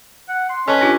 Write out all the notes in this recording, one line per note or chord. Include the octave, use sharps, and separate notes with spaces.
F#5
C6
C#4 A4 B4 D#5 A5
D4 F4 G4